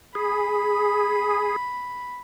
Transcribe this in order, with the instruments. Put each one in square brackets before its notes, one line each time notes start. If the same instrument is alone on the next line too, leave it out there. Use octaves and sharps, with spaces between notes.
[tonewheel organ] G#4 [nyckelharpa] B5